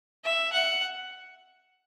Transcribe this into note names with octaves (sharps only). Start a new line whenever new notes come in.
E5
F#5